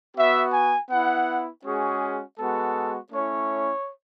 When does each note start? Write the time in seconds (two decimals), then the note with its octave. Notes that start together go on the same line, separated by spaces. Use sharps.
0.15 B3 F#4 E5
0.52 G#5
0.90 B3 E4 F#5
1.63 G#3 C#4 F#4 G#4
2.37 G#3 B3 F#4 A4
3.11 A3 C#4 E4 C#5